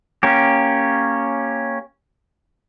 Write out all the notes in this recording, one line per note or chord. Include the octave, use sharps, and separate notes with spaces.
A#3 C#4 G4